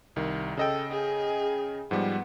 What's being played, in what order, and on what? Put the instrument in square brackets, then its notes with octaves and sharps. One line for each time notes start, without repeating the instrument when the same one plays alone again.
[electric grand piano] C2 D#3
[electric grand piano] C#3 D#5 G5 [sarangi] A4
[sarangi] G#4
[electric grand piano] G#2 F3 G3 [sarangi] B3